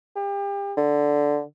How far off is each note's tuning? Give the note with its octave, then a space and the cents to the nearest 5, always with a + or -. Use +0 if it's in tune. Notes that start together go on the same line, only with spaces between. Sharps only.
G4 +35
D3 -5